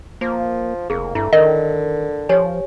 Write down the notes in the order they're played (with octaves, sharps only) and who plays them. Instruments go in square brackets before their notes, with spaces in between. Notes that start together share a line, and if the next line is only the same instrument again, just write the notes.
[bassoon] F3 [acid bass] A#3
[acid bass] F1 [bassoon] A#3 [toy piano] G#4
[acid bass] G2 [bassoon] A3 [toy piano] E4
[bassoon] D3 [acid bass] D#3 [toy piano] A#4 [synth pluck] D#5
[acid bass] F3 [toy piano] G4 C#5 G#5